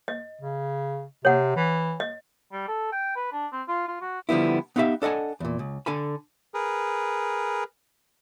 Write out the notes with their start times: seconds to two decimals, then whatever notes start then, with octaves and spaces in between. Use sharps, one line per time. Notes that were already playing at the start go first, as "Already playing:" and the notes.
0.08 D#5
0.41 C#3
1.25 C3 C#5 F#5
1.56 E3
2.00 D#5
2.52 G3
2.68 A4
2.92 G5
3.16 B4
3.32 D4
3.52 C4
3.68 F4
3.88 F4
4.01 F#4
4.29 D3 F3 G3 B3 E4
4.76 B3 D#4 E4 G4 E5 F5
5.02 D4 A4 D#5 F#5 G#5
5.40 E2 A#2
5.59 C#2
5.86 D3 A4 G#5 B5
6.54 G#4 A#4 B4